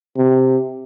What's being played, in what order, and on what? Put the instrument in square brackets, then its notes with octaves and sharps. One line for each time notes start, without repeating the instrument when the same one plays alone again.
[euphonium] C3